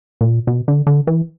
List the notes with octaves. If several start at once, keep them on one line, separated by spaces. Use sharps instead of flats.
A#2
B2
D3
D3
E3